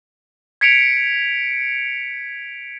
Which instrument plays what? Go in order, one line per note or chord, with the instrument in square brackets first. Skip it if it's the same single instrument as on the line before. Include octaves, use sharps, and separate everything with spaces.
[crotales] G#6 B6 C#7 D7 F7